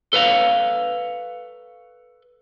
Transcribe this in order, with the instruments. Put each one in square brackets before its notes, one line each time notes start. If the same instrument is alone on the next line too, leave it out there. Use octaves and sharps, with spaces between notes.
[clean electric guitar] A4 B4 C#5 F5